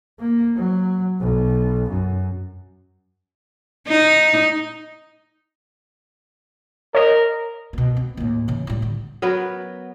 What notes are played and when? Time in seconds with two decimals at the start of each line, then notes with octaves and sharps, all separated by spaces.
0.20 A#3
0.56 F#3
1.20 B1
1.90 F#2
3.88 D#4
6.95 A#4 C#5 D#5
7.73 B2 B3
7.97 C4
8.17 D#2 A2
8.48 C#3 E3
8.67 A2 G3
8.82 D3
9.22 F#3 B3 A#4 B4